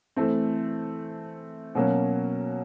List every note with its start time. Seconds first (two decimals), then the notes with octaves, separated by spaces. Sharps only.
0.16 E3 A3 C4
1.75 B2 F#3 A#3 C#4